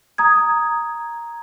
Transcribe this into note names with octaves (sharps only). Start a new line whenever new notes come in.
A#5 D#6 G#6